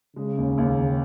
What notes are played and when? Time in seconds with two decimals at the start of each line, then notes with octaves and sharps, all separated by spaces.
0.16 C#3 G#3
0.38 D#2
0.58 D#2
0.79 D#3